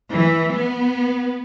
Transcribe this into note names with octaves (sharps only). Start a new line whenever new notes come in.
E3
B3